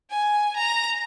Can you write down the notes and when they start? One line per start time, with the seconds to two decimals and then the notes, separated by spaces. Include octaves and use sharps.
0.11 G#5
0.57 A#5